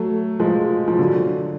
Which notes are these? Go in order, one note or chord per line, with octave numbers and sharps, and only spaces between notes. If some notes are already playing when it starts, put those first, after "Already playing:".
Already playing: F#3 A3
F3 G#3
F3
D3 F#3